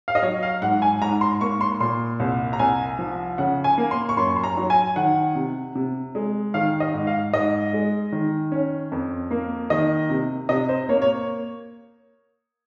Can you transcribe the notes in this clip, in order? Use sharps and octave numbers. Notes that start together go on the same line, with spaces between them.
F5
D#5
F#3 C#5
F5
G#2 F#5
G#5
G#2 A#5
C6
A#3 C#6
C6
A#2 C6
C2
A#5
C2 G#5
F3
C#3 F#5
G#5
A#3
C6
C#6
F#2 C6
C6
A#5
F#3
G#5
D#3 F#5
C3
C3
G#3
D#3 F5
D#5
G#2
F5
G#2 D#5
G#3
D#3
C#4
F2
A#3
D#3 D#5
C3
C3 D#5
C5
A#3 C#5
C#5